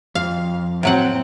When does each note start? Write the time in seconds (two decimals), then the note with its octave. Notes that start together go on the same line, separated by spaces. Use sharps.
0.15 F2 F5
0.83 A2 F#3 C4 F#5